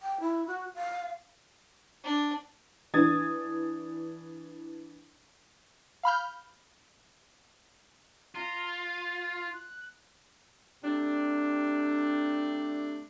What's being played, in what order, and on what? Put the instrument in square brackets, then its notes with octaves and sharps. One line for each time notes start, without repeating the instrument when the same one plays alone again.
[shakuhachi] G5
E4
F#4
F5
[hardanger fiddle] D4
[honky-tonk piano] E3 D4 D#6 G#6 A6
[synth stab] F5 B5 F6 G6
[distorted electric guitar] F4 [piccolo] A#5
[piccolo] A6
F#6
[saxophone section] C3 G3 A3 D4